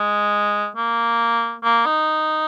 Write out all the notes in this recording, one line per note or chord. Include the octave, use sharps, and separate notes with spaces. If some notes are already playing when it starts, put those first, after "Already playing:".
Already playing: G#3
A#3
A#3
D#4